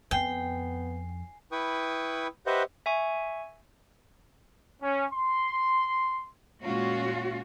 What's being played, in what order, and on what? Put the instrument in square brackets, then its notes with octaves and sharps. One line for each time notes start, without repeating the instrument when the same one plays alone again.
[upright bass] F2 [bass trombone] B3 [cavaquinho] G5 [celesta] G#5 C7
[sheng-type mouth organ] E4 B4 G5 C#6 D#6
G4 B4 C5 D#5 E5 F#5
[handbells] E5 G#5 C#6
[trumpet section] C#4
C6
[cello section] A#2 G#3 C#4 F4 F#4